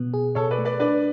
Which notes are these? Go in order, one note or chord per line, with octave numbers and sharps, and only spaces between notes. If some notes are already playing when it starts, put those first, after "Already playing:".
Already playing: B2 B3
G#4
B2 A4 C#5
B4 D5
A3
B4 D5
D4 B4 D5